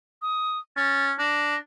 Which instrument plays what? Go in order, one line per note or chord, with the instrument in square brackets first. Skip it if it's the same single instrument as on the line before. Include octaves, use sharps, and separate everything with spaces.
[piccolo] D#6
[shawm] C#4 [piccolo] A6
[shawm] D4 [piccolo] A#6